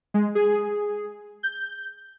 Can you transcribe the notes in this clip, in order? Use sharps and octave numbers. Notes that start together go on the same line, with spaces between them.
G#3
G#4
G6